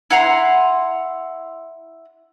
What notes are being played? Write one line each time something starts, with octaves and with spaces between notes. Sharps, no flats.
E4 F#5 A#5 C6